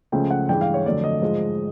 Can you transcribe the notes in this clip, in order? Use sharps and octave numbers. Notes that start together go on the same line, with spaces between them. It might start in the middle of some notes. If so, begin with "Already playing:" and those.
C#2 C#3 F3 A3 G5
F#5
G2 E3 G#3 G5
F5
C#5
F2 D3 F#3 A3 D5
D#5
G#2 F3 G#3